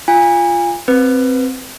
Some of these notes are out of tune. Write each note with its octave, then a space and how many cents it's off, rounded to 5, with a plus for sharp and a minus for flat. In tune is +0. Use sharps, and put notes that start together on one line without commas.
F4 -10 G#5 -30
C4 +0 B4 +0